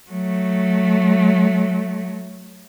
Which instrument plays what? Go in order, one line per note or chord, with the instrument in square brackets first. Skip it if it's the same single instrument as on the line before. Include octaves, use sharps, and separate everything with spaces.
[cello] F#3 A3